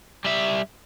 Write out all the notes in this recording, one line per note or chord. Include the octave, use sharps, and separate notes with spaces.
G3 E5